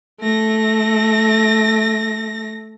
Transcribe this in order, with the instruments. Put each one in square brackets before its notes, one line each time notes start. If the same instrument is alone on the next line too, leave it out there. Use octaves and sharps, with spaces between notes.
[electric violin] A3 A#6